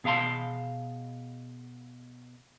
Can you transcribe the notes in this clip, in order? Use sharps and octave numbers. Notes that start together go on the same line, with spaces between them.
B2 G#4 F5 A5 C6